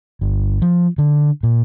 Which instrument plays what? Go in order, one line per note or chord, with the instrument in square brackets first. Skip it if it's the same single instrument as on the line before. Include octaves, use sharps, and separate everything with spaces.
[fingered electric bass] G1
F3
D3
A#2